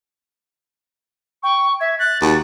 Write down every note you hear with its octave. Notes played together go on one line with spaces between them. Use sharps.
G5 C#6
E5 G#6
F#6 A6
D#2 F#4